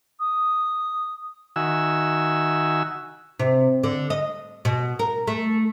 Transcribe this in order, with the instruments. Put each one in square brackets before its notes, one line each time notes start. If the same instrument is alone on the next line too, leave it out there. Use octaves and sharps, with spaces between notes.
[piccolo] D#6
[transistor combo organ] D#3 F#4 E5 G#5 E6
[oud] C3
D3
D#5
B2
A#4
A3